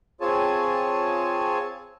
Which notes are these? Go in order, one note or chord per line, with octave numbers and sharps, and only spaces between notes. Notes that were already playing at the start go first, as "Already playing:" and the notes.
C4 F4 G#4 C#5 G#5 A5